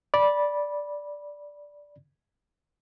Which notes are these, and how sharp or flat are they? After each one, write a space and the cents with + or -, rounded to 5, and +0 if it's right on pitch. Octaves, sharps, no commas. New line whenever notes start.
D5 -5 B5 -15